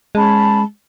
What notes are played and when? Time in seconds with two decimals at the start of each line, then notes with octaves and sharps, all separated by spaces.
0.15 G#3 C#4 A5 B5